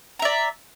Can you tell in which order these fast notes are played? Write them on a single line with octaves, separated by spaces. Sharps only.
A#5 E5 D5